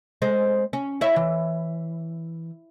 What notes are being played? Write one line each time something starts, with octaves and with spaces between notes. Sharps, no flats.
G#3 C4
C#4
E4 C#5 E5
E3